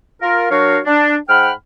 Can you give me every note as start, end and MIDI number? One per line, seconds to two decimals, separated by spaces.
0.22 0.48 65
0.22 0.48 70
0.51 0.78 54
0.51 0.78 62
0.51 0.78 66
0.51 0.78 70
0.51 0.78 73
0.51 0.78 77
0.86 1.15 62
1.29 1.51 44
1.29 1.51 78
1.29 1.51 79
1.29 1.51 83
1.29 1.51 89